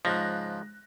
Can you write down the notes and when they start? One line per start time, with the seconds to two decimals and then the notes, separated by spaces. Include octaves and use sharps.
0.05 G#2 C#3 F3 F#6 A#6